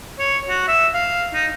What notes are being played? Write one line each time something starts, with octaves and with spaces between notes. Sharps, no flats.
C#5
F#4
E5
F5
D#4